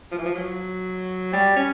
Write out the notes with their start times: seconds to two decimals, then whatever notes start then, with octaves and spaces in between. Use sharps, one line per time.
0.12 F3
0.18 E3
0.26 F3
0.35 F#3
1.33 G3
1.56 C#4